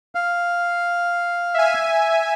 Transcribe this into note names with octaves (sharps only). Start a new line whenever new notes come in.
F5
E5 G#5